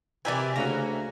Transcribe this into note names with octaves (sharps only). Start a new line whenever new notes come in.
C3 E3 C4 E4 A#4 D5 G#5
D2 C#3 A#3 C#4 F#4 A#5